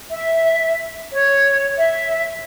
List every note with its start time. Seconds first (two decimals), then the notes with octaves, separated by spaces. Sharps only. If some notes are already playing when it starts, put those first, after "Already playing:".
0.11 E5
1.12 C#5
1.77 E5